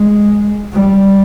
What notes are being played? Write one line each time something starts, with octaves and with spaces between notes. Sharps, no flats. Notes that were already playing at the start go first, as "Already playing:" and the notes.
Already playing: G#3
G3